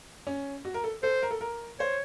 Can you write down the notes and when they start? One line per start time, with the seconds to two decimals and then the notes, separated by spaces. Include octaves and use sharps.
0.27 C#4
0.65 F#4
0.74 A#4
0.84 A4
1.03 A4 C5
1.22 A#4
1.31 A4
1.41 A#4
1.80 C5 C#5